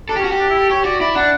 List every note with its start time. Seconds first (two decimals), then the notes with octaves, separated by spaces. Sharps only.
0.09 D4 A4
0.17 G4
0.20 C#4
0.24 F#4
0.32 G4
0.40 D4
0.50 E4
0.60 A4
0.70 G4 C#5
0.85 F#4 D5
1.00 E4 D5
1.15 D4 F#5